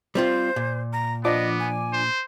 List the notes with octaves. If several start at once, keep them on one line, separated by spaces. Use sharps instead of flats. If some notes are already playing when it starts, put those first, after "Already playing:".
G3 C4 F4 C5
A#2
A#5
F3 B3 D4 D#5 D6
G#5
C5